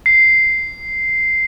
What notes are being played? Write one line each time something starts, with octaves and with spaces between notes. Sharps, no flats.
C7